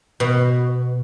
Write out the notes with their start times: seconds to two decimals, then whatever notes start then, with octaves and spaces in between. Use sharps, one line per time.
0.20 B2